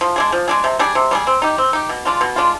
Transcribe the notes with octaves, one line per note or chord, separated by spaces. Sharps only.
F3
G#3 D4 G#4
F3
G#3 D4 G#4
C3
G3 D4 G#4
C3
G3 D4 G#4
C4
D#4 G4
C4
D#4 G4
B2
G#3 D4 F4
B2
G#3 D4 F4